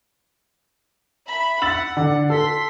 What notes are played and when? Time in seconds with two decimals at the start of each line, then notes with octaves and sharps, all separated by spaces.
1.27 E5 B5
1.62 F#5 E6 A6 F#7
1.97 D3
2.30 A4 C6 B6